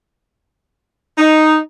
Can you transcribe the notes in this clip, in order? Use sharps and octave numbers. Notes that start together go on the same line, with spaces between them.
D#4